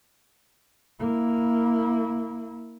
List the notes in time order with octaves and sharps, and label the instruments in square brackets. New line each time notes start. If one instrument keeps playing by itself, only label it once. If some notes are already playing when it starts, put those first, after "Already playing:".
[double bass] A#3 E4